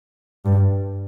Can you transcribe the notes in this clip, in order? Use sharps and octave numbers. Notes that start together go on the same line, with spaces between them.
G2